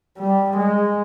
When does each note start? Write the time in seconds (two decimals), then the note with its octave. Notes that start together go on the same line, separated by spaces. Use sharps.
0.19 G3
0.57 G#3